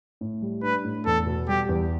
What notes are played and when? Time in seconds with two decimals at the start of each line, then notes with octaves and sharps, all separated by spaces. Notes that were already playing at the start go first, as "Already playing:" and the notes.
0.21 A2
0.42 G3
0.63 D4 B4
0.84 A2
1.06 E2 A4
1.27 B2
1.48 G3 G4
1.69 E2